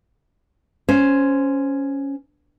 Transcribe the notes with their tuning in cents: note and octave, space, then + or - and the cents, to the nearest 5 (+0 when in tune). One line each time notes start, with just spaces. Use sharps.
C#4 +0 C5 +0